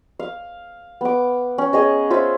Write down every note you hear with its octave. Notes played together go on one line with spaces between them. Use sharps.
F5
B3 D6
C#4
G#4 C#5 D#5
F4 C5 C#5 E5